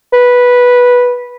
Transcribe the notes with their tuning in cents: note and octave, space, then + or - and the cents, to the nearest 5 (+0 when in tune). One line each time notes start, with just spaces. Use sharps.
B4 -10